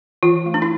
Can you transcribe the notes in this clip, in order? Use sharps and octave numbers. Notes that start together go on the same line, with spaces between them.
E3 F4
A3
D4
E4